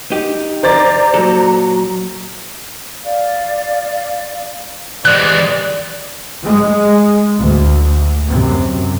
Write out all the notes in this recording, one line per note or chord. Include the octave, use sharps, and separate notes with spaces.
D#4 G4
C5 D5 A#5 A6
A#2 F#3 A4
D5 F5
E3 G#3 G4 B4 C5 D5 F#6
G#3
D2
F#2 C3